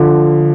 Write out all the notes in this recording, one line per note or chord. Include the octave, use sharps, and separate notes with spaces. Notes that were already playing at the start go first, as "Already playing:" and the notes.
Already playing: D3 F3